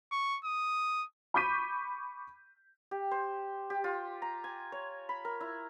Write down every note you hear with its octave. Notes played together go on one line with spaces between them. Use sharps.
C#6
D#6
B5 C#6 D6 G6 B6 D#7
G4
C5
G4
F4
A#5
G#5
C#5
B5
A#4
E4